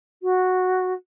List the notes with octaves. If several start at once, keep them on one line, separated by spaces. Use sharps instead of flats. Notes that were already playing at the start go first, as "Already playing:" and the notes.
F#4